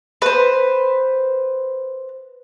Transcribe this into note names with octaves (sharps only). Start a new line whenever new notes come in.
B4 C5